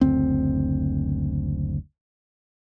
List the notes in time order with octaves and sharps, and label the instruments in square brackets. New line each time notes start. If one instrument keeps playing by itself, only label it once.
[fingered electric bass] F#1 D2 C4